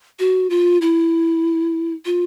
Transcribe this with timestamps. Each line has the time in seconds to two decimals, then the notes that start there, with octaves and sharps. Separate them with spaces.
0.19 F#4
0.50 F4
0.81 E4
2.05 F4